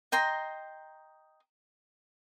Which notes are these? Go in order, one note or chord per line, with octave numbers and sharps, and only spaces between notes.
D#5 G5 A#5 C6